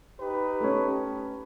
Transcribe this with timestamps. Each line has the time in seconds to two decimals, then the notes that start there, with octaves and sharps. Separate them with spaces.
0.20 D#4 G4 B4
0.60 A3 C#4